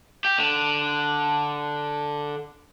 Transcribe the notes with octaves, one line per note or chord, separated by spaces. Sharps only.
G4
D3